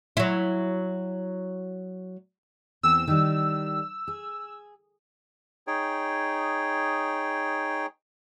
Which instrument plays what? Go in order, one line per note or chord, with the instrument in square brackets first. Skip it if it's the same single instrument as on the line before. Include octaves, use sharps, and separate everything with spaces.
[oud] F#3 E4
[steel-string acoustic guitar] E2 C4 [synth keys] E6
[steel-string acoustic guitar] D#3 G3
G#4
[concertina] D#4 G#4 C#5 G5